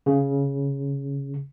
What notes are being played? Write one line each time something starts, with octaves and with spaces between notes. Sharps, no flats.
C#3